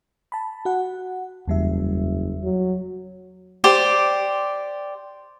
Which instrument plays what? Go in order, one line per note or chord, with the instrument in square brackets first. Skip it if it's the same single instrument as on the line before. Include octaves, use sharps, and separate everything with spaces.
[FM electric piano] A5 B5
F#4 F#5
[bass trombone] F#1 [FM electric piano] E2 G3 E5
[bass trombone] F#3
[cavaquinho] G4 C5 D5